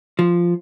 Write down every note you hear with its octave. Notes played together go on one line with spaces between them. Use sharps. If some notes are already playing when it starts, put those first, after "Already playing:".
F3